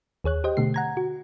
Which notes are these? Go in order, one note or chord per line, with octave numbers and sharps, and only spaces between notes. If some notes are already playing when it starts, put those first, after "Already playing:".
D#2 G#4 C#5 F#6
G4 C5 D#5 G5
B2 D3 A3 C7
F#5 A#5 G#6
F#4